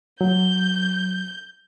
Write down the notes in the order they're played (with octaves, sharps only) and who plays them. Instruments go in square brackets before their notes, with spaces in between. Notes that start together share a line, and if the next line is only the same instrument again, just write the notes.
[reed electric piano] F#3 [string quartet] G6